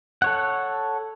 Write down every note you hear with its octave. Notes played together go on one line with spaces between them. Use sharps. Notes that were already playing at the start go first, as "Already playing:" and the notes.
A4 C#5 F#5